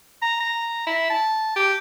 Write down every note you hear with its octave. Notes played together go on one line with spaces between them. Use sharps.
A#5
A#5
E4
A5
G4